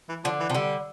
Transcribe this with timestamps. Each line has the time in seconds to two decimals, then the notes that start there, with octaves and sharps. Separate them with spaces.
0.09 E3
0.24 D3 F3
0.40 E3
0.50 C3 F3
0.55 D3 G3